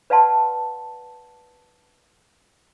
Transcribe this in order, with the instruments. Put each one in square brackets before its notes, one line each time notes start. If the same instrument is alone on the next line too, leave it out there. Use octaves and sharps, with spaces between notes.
[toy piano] B4 D5 F5 F#5 A5 C6